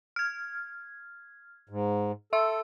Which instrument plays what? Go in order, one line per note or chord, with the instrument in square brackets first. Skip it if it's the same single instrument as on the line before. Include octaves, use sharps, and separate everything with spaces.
[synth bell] F6 G#6
[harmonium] G#2
[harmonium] A4 [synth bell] E5 C6 E6